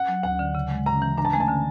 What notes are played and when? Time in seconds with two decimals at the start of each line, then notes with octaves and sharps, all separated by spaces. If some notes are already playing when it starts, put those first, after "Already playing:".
Already playing: F#5
0.09 F#3
0.23 D2 F#5
0.39 D3
0.55 C#3
0.71 G#3
0.86 C#3 A#5
1.02 E3
1.18 D4 A#5
1.25 A5
1.33 A3 G#5
1.40 A5
1.48 D3